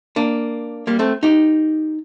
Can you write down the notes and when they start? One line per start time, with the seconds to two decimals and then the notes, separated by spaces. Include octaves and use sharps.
0.16 A#3 D4
0.87 G3 A#3
0.99 A3 C4
1.23 D#4 G4